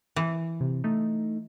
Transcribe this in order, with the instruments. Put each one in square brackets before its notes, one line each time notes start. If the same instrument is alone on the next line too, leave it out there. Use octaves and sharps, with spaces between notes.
[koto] E3
[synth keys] C3
A3 D#4